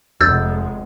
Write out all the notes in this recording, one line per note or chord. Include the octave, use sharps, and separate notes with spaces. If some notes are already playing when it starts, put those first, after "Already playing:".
F1 F2 G#3 E6 G6 A6